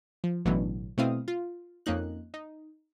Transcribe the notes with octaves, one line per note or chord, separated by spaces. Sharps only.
F3
A1 B2 D3 E3 F#3
B2 A3 C4 E4 F5 D#6
F4
F2 A#3 C#4 D#4 F#6
D#4